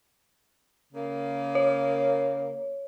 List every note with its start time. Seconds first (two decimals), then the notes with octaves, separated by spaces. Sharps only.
0.93 C#3 A#3
1.55 C#5